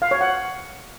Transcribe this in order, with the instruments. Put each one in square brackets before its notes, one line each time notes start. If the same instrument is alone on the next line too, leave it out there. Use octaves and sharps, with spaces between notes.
[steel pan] F5
C#5
F#5